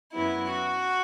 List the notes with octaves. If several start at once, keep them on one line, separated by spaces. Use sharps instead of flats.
F#2 F#3 B3 E4
F#4